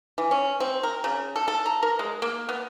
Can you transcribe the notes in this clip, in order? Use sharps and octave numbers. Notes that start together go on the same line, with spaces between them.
E3
C#4
C4
A#4
C#3
A4
A4
A#5
A#4
G#3
A#3
B3